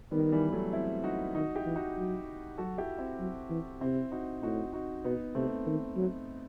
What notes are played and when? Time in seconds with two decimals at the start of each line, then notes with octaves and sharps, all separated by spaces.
0.11 D#3 G3 B3
0.32 E3 G3
0.52 F#3 A3
0.73 C4 E4
1.03 D#4 F#4
1.35 D#3 D#4 F#4
1.55 E4 G4
1.66 E3
1.75 D#4 F#4
1.97 F#3
2.58 F#3 F#4 A4
2.78 E4 G4
2.98 C4 E4
3.20 F#3
3.50 E3
3.81 C3 C4 E4
4.11 D#4 F#4
4.42 A2 D#4 F#4
4.73 D#4 F#4
5.04 B2 B3 D#4
5.35 C3 A3 C4
5.66 D#3
5.96 F#3